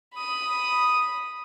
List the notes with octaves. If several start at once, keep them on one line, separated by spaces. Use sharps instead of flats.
B5 D#6